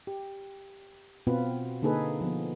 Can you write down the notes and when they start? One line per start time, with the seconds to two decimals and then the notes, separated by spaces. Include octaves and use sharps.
0.07 G4
1.27 B2 B3 C4 F4 B4
1.82 D3 A#3 D#4 G#4 A4 B4
2.21 F3 B3